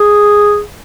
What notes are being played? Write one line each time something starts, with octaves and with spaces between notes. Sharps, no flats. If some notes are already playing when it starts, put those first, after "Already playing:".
Already playing: G#4